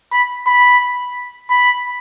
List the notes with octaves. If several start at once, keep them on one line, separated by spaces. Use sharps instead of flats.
B5
B5
B5